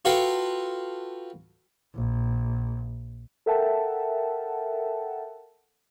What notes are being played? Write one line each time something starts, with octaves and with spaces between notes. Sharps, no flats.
F4 F#4 A4 B4 F5 G5
A#1
A4 A#4 E5 F#5 G5 A5